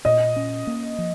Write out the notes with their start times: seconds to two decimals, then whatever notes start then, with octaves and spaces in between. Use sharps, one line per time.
0.05 A#2 D#5
0.36 C#4
0.67 A#3
0.98 F3